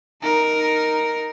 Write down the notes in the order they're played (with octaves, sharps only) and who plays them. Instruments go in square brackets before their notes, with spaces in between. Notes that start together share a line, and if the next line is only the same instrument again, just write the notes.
[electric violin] D#4 A#4